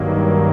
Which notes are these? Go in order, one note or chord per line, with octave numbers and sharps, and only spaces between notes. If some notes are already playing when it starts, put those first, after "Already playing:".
Already playing: G2 D#3 F#3 A#3